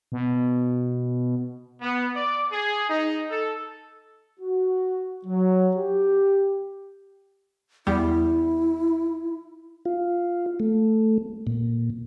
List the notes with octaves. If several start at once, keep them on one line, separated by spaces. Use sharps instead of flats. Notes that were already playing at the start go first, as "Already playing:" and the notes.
B2
B3
D5
G#4
D#4
A4
F#4
F#3
G4
E2 G3 E4
F4
A3
A#2